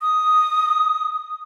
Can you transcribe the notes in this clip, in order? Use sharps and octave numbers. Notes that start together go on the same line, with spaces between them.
D#6